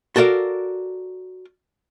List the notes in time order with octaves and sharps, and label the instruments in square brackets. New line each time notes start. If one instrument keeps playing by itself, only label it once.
[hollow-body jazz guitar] F#4 A4 A#4 D5 F5